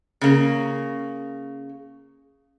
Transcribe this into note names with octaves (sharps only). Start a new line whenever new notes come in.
C#3 A#3